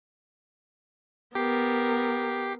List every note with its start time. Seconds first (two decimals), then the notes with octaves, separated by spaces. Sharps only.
1.35 B3 G4 A#4 C7